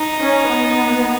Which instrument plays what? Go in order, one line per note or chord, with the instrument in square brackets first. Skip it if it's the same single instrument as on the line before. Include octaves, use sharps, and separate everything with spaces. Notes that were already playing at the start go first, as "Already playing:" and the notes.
Already playing: [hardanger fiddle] D#4
[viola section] C#4
B3